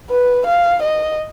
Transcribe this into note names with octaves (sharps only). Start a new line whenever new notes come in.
B4
F5
D#5